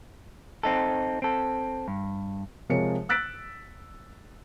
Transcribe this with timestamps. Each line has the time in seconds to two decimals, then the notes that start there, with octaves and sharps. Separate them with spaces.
0.63 C4 D#4 A4
1.22 C4 A4
1.88 G2
2.69 C3 F3 G#3 A#4 C#5 C#7
3.09 E6 F#6 A6 B6 D7